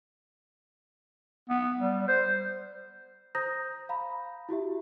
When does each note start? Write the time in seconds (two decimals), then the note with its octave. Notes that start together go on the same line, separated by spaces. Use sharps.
1.50 B3
1.80 G3
2.08 C5
3.35 C5 A#5 D#6 G6 A#6
3.89 F5 A#5 B5
4.49 E4 F#4 G4 E5